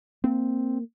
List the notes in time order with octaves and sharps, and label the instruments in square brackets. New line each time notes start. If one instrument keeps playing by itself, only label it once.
[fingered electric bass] A#3 [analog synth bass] C4